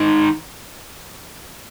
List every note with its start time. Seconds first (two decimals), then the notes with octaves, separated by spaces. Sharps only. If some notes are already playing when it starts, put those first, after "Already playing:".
Already playing: D#3 G#3 D#4